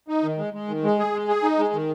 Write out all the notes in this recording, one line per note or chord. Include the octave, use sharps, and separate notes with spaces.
D#4
D#3
G#3
G#3
D#3
G#3
G#4
G#3
G#4
D#4
G#3
D#3